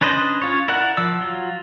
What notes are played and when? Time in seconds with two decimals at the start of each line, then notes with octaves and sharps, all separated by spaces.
0.01 C#4 D4 B4 C5 D#5
0.42 C#4 F4 C#5
0.68 E4 A#4 D5 F#5 F#6
0.97 F3 D5 E6
1.20 F#3 F4